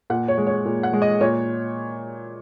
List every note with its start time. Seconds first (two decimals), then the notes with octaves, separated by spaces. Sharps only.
0.10 A#2 F#5
0.28 C#5
0.38 G#3
0.47 C#5
0.65 A#2
0.83 F#5
0.93 G#3
1.02 D#5
1.21 A#2 C#5